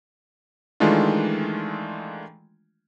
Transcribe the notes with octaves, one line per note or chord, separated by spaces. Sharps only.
D#3 E3 G#3 A3 D4 F4